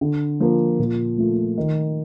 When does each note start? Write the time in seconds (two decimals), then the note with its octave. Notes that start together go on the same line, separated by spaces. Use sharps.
0.01 D3
0.40 F3 A#3
0.79 A#2
1.18 F3 A3
1.57 D#3